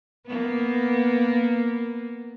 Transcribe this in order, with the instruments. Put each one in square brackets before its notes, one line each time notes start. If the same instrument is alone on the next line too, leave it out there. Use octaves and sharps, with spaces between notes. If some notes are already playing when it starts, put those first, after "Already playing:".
[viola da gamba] A#3 B3